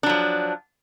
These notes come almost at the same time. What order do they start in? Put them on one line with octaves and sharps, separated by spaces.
D4 F#3 F3